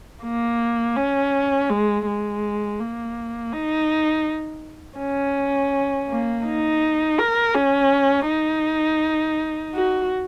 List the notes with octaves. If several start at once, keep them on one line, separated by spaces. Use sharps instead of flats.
A#3
C#4
G#3
G#3
A#3
D#4
C#4
A#3
D#4
A#4
C#4
D#4
F#4